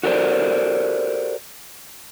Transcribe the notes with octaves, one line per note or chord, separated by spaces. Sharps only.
F#4 G4 A4 A#4 C5 D5